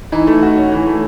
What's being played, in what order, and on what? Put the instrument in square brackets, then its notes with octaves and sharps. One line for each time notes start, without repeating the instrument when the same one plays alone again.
[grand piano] E3 [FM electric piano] D#4
[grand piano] A3
F#4
C#4
E3
A3